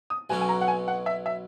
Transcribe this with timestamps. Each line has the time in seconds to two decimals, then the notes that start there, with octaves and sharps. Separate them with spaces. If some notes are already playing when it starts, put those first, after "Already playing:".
0.10 D#6
0.30 B1 B2 F#3 C#4 G#5
0.41 G#5
0.49 A#5
0.61 F#5
0.68 G#5
0.88 F#5
1.06 E5
1.26 E5